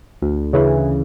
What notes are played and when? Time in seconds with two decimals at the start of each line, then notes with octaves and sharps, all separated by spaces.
0.22 D2
0.53 C#3 E3